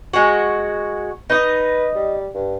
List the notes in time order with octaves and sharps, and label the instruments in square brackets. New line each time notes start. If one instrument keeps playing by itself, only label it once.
[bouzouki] G#3 F#4
[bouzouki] D#4 D#5 [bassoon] B4
[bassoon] G3
G2